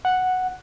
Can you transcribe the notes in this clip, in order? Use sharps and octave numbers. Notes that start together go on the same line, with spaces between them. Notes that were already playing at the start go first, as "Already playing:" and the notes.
F#5